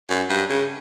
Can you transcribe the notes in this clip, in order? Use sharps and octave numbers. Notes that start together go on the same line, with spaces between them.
F#2
G2
C#3